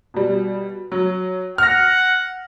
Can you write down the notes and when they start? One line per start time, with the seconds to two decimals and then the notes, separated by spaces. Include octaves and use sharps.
0.14 B2 G3
0.92 F#3
1.58 F#5 F6 A#6